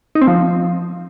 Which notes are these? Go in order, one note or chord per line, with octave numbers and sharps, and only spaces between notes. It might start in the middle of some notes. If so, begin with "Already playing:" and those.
D#4
C4
F3